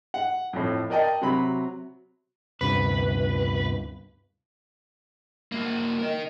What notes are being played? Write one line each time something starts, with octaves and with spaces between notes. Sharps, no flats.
F#5
F2 A2
A#4 D5 D#5 G5 A5
C3 F#3 A#5 B5
D2 G2 C3 B4
A#3 F#4
A#4 D#5